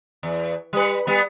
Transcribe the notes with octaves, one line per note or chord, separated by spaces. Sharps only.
E2
G3 B4
G3 B3